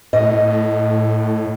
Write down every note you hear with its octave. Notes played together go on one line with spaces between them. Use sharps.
A2 D#5